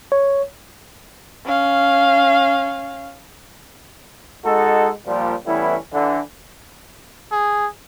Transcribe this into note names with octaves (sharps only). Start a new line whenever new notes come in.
C#5
C#4 F5
G#3 D#4 F#4 A4
A#2 F3 G3
E3 G3 A3 B3 C#4 E4
D3 E3
G#4